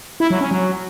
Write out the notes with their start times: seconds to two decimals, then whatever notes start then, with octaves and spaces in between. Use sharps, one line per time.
0.20 E4
0.30 F#3
0.41 C#4
0.51 F#3